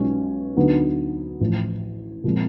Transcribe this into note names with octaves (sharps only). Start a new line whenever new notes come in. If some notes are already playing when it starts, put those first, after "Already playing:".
Already playing: B1 B2 G#3 C#4 F4
D2 D3 F#3 B3 D#4
A1 A2 F3
A#2 F3 G#3 C4